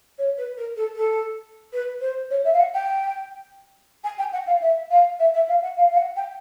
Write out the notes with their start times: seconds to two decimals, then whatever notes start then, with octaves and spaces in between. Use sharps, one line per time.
0.18 C#5
0.37 B4
0.57 A#4
0.76 A4
0.95 A4
1.72 B4
2.00 C5
2.30 C#5
2.44 E5
2.53 F5
2.59 F#5
2.73 G5
4.03 G#5
4.18 G5
4.32 F#5
4.47 F5
4.61 E5
4.90 F5
5.19 E5
5.34 E5
5.48 F5
5.62 F#5
5.77 F5
5.90 F5
5.96 F#5
6.16 G5